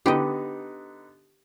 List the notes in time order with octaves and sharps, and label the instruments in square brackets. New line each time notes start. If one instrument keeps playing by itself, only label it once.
[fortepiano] D3 B3 D#4 [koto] G4 D#5